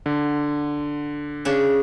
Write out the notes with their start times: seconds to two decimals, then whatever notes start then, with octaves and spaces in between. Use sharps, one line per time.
0.06 D3
1.45 C#3 D4